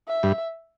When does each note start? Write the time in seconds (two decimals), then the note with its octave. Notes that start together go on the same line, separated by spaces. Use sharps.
0.08 E5
0.23 G2